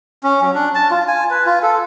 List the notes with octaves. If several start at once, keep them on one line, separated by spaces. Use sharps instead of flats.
C#4
F#3
D4
A5
F4
G#5
B4
F4
A4